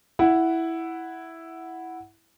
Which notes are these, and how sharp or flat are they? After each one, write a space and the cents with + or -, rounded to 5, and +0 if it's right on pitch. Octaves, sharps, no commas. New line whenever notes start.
E4 +0 F#5 +0